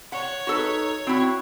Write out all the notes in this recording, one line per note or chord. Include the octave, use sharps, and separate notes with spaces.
C#5 F#5
D#4 F#4 A4 B4
C4 E4 F#4